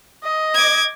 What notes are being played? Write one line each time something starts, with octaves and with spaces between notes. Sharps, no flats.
D#5
D6 G#6